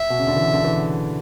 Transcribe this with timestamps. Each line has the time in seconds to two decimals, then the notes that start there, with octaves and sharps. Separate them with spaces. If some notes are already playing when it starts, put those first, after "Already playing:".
Already playing: E5
0.10 B2
0.19 C#3
0.27 D3
0.36 E3
0.54 D3
0.64 E3